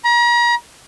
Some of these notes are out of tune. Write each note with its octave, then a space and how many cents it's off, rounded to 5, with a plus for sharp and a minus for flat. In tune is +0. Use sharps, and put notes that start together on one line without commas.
A#5 +40